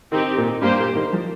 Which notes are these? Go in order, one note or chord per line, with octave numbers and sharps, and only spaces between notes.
D#3 C4 D#4 G4
A#2
G2 A#3 G4 C5
A#2
D#3
F3